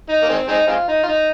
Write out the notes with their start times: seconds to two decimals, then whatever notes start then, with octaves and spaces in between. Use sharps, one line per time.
0.09 D#4
0.22 A#3
0.29 D#3 G#3 C4
0.48 G#3 C4 D#4
0.68 G#3 C4 F4
0.88 D#4
1.03 F4
1.08 D#4